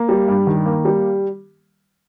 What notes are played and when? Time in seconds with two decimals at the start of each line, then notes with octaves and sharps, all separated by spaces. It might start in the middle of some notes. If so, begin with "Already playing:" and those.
Already playing: A#3
0.09 G3
0.28 G2
0.47 D#3
0.66 A#3
0.85 G3